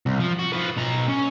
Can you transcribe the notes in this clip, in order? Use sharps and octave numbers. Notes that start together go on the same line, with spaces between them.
C2
F3
F#4
F3 B4
B2 A#5
C#4